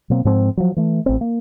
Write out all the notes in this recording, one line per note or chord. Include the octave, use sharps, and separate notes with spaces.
B2 F#3 A#3 C4
G#2 F3 C4
F3 F#3
E3 A3
A1 C4
A#3